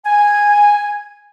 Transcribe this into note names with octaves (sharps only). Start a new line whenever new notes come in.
G#5